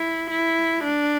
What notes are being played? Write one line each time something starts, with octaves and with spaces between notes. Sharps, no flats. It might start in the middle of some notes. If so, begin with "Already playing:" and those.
Already playing: E4
E4
D4